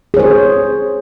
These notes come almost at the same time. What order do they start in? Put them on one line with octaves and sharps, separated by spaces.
G#4 C#5 C5